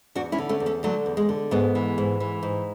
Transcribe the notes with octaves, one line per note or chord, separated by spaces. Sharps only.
E2 D4 F#4
C#4 E4
D3
A3 C#4
E2
A3 C#4
D3 F#3 A3
E2
G#3
D3
G#2 G#3 B3
E3
G#2
E3
G#2